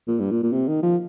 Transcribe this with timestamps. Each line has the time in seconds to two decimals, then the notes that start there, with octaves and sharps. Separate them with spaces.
0.08 A#2
0.20 G2
0.31 A#2
0.43 A#2
0.53 C3
0.68 D#3
0.83 F3